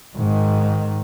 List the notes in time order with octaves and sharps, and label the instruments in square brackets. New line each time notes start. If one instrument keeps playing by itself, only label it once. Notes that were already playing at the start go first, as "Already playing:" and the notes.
[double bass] G#2 D#3